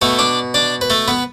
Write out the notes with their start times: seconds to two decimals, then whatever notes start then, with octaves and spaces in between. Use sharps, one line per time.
0.02 B2 A3 A4
0.19 D4 D5
0.54 D4 D5
0.81 B4
0.90 A3 A4
1.08 B3 B4